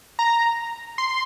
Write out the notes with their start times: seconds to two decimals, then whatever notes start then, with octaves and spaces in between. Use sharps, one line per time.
0.19 A#5
0.98 C6